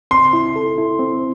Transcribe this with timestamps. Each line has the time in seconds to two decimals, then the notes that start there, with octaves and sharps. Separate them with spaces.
0.11 C4 C6
0.33 E4
0.56 A4
0.78 E4
0.99 C4